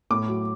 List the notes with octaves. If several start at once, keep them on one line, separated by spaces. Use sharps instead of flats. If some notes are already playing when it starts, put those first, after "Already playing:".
A2 D6
F#3